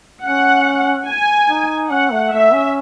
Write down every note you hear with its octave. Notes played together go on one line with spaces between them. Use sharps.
C#4 F#5
G#5
D#4
C#4 F#5
A3
A3 E5
C#4